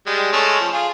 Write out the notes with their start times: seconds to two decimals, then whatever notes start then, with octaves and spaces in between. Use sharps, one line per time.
0.07 G3 G#3
0.33 G#3 A3 C#4
0.60 F3
0.73 F4 G#4